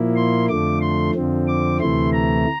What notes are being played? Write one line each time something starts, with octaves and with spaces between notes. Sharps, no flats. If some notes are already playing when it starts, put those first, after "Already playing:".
Already playing: A#2 F3 A#3 E4
C6
F2 D3 F3 A3 D6
C6
F2 D3 F3 C4
D6
D2 C3 E3 A3 E4 C6
A#5